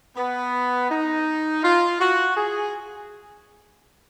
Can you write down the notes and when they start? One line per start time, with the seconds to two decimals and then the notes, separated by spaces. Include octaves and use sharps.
0.16 B3
0.89 D#4
1.63 F4
1.99 F#4
2.35 G#4